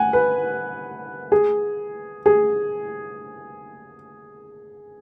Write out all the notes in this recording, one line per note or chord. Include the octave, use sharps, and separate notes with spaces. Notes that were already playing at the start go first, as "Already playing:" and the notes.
Already playing: F#5 G#5
B4
G#4
G#4